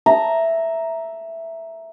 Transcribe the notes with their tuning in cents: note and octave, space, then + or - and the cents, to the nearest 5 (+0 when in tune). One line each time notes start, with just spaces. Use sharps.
E5 +0 A#5 +0